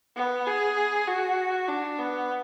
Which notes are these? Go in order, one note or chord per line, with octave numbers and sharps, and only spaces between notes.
B3
G#4
F#4
D4
B3